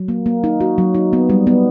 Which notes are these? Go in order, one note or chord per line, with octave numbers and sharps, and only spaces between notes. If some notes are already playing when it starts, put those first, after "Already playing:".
Already playing: F#3
A#3
A#3
D#4
F#4
F#3
D#4
B3
G3
B3